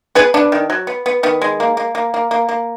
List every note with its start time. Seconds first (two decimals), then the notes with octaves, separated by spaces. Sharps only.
0.15 B3 G#4 B4
0.34 B3 D4
0.52 D#3
0.70 F#3
0.87 B3
1.06 B3
1.23 D#3 B3
1.42 G#3
1.60 A#3
1.77 A#3
1.95 A#3
2.14 A#3
2.31 A#3
2.49 A#3